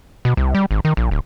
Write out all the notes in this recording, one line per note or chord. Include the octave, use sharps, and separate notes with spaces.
B2
C2
G3
G#1
D#3
A#1
D1